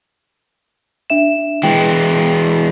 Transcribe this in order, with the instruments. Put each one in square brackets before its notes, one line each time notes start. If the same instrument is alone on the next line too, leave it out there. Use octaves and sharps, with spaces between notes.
[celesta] D4 E5 E7
[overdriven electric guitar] E3 G#3 [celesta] G5